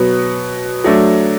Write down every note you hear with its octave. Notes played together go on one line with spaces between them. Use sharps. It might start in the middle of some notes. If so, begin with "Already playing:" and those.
Already playing: B2 F#3 B3
F#3 A3 D4